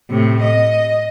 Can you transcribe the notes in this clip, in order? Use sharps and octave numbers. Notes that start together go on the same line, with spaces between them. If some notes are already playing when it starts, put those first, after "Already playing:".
A2 C3
D#5